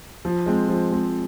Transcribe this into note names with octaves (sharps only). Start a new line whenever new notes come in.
F3
G#3 C4
F3
G#3 C4